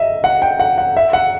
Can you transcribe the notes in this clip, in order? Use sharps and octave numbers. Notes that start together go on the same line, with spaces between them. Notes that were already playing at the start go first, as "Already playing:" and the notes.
Already playing: D#5 E5
F#5
G5
F#5
F#5
E5
F#5